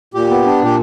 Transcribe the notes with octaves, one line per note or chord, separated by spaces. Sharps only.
A#2 G4
B3
D4
A#2 G4